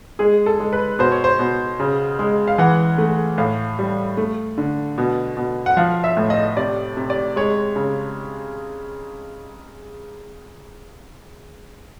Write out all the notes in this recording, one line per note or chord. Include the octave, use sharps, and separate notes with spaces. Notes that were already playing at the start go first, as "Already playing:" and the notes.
G#3 G#4
A4
G#3
B4
B2 C5
C#5
C5
B2
C#3
G#3
F5
E3 F#5
A3
A2 F5
G3
A3
D3
B2
B2
F#5
F3 F5
E5
A2
D#5
C3 D5
C3
D5
G#3 C#5
C#3